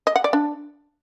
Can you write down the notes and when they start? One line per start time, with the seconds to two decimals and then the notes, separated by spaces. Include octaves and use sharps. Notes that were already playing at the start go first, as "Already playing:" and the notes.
0.07 D#5
0.16 F#5
0.24 D5
0.33 D4